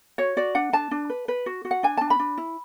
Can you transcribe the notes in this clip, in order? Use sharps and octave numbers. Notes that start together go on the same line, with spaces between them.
F#4 C#5
F#4 D5
D4 F#5
D4 A5
D4
B4
B4
F#4
F#4
F#5
D4 G#5
D4 A5
B5
D4
E4